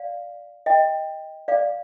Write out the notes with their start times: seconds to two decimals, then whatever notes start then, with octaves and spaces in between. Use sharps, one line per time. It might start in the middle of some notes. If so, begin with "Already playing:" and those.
Already playing: D5 F5
0.66 D#5 G5
1.48 D5 F5